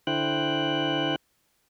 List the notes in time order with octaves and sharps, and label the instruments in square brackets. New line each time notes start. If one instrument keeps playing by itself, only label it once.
[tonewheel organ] D3 E4 C5 G5 F#6